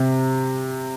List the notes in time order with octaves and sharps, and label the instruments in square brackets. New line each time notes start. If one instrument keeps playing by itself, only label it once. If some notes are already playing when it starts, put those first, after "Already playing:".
Already playing: [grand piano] C3